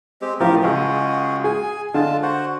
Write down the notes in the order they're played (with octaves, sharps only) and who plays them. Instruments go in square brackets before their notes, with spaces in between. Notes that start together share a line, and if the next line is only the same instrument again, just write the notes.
[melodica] G#3 C4 G4
[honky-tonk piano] A1 F3 F5 [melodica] G4 A#4
[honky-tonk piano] C#2 [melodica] G#3 F#4 G#4
[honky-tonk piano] G#4 [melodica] G#5
[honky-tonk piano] D3 [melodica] G#3 F4 A5
[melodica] F#4 C5 F#5